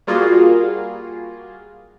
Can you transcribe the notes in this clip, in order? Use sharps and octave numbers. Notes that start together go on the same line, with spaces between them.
G3 A#3 F4 F#4 G#4